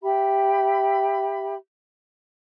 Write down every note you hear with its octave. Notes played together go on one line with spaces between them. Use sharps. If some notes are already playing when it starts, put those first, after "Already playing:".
G4 E5 B5